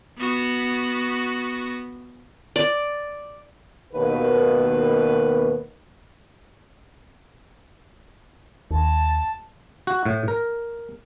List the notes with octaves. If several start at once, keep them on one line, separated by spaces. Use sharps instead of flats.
B3 F#4
D5
D#2 B2 B4
D#2 A5
F#4
A2
A#4